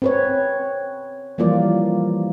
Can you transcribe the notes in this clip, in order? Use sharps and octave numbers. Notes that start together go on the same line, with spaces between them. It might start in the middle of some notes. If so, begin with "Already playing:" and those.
C4 B4 C#5
E3 F3 G3 A#3 F4 D5